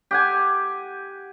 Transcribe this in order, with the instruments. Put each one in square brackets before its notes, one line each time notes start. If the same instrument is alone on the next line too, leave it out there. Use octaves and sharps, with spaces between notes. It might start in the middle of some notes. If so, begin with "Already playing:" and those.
[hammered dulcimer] G4 F#5 G#5